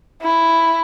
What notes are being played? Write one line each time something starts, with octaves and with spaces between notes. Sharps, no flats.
E4